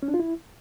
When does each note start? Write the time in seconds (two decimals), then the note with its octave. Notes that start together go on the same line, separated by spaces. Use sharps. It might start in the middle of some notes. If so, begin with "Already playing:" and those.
0.03 C#4
0.08 D4
0.14 F4
0.20 E4